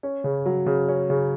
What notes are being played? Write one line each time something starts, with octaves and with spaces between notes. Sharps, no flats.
C#4
C#3
F#3
C#3
C#4
C#3